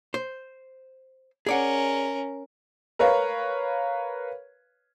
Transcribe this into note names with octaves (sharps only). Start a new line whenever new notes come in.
C5
C#4 G#4 A#4 D5 F#5
A#4 B4 C#5 F5